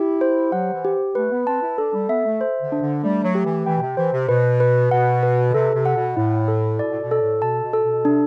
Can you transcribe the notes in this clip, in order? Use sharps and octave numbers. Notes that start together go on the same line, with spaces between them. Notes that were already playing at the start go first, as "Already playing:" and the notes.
Already playing: E4 G4
C5
F#3 F#5
E3
G4
A3 B4
B3
C4 A5
E4
D4 A4
G3
B3 E5
A3
C5
D3
D4
D3
G3 A3
F#3
G4
E3
E3 G5
B2
C3
E3 C5
C3
B2 B4
B4
B2 F#5
B4
D3
C3 A4
C3
F#5
B2
A2 E4
A4
B2 D5
A2
B2
A4
A2
B2 A5
B2
A4
B2
C3 D4